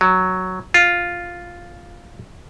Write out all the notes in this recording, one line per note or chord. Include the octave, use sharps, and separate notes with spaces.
F#3
F4